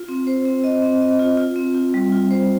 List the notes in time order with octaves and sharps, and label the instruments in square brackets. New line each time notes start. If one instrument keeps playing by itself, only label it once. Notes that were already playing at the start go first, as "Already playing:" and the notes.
Already playing: [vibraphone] F4
C4
C5
C4
D#5
C4
D#5
F4
F4
C4
F4
G3
F4
C5